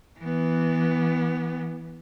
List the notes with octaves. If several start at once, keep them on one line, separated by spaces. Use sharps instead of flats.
E3 B3